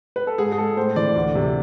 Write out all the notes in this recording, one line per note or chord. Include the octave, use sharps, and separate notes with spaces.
B4
A4
G#2 G#4
G#4
G#3 A4
A2 C5
E3 D5
D2
C3